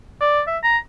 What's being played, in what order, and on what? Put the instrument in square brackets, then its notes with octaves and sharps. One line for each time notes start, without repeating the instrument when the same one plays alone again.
[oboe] D5
E5
A#5